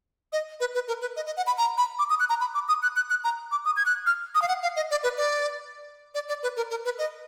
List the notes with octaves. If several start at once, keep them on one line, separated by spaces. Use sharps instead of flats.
D#5
B4
B4
A#4
B4
D#5
D#5
F#5
B5
A#5
B5
D6
D#6
F#6
A#5
B5
D6
D#6
F#6
F#6
F#6
A#5
D6
D#6
G#6
F#6
F6
D#6
F5
F#5
F5
D#5
D5
B4
D5
D5
D5
B4
A#4
A#4
B4
D#5